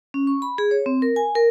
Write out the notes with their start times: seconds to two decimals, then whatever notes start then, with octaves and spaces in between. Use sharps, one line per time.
0.14 C#4
0.27 C#6
0.42 B5
0.58 G#4
0.71 C#5
0.86 C4
1.02 A#4
1.16 G#5
1.35 A#4